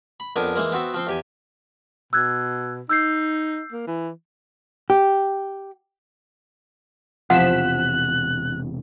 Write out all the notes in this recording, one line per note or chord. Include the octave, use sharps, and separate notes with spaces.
B5
F2 B3 D4 A#4 G#5
E3 G#3 A#3
B3 C4 F#4 E5
F3 C4 C6
E2 G4 G#5
B2 E6 F#6 G#6
D#4 E6 G6 C7
A#3
E3
G4
E1 E2 C3 F3 F#5 F#6 B6 E7